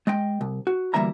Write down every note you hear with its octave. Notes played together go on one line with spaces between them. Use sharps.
G#3 D#5 G5
C2
F#4
D2 E3 G3 A#3 E5 A#5